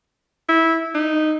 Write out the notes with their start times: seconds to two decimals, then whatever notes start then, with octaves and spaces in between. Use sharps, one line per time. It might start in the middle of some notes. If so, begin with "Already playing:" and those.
0.49 E4
0.94 D#4